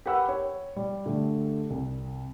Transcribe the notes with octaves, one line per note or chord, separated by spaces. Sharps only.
G4 A#4 B4 F#5 B5 E6
C#5
G3
D3 A3 G4
C2